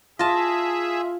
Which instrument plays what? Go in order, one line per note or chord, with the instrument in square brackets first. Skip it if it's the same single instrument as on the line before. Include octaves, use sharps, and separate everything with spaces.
[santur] F4 [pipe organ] G#4 E5 [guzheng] D#5 A5